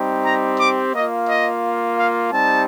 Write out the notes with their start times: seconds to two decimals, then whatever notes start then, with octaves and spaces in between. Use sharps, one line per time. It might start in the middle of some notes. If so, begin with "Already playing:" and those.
Already playing: G3 C4 D#4 G4
0.25 A#5
0.60 D6
0.95 A#3 F4 D#5
1.29 D#5
1.98 F5
2.32 G3 C4 D#4 G4 A5